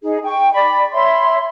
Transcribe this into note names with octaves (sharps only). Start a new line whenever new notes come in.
D#4 G#4
G5 C#6
D5 B5
C#5 E5 B5 C6